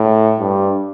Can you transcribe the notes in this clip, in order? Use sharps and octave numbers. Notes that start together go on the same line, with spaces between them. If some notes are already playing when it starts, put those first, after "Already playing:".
Already playing: A2
G2